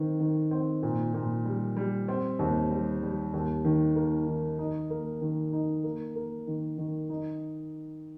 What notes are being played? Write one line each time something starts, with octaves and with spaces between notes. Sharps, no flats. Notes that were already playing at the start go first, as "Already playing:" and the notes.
Already playing: D#3 C4
D#3
C4
A#2
A#2
G3
G3
C4
D#2
G3
G3
D#2
D#3
A#3
D#3
D#4
A#3
D#3
D#4
A#3
A#3
D#3
D#3
D#4